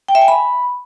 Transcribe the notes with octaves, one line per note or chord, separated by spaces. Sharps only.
G5
E5
G#5
B5